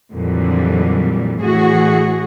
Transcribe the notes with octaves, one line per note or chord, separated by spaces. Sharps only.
F2 A#2 D3 E3 F#3 G3
A2 E3 F#4 G#4